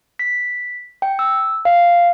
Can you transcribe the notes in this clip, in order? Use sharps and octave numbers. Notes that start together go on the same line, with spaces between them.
B6
G5
E6
F5